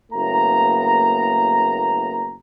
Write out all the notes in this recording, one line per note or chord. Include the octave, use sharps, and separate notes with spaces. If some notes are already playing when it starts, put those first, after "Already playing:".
F#1 A2 A#3 B3 A#5